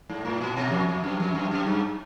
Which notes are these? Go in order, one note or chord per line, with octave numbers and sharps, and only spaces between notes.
G#2
A2
A#2
B2
F2
F2
F#2
F2
F#2
F#2
G2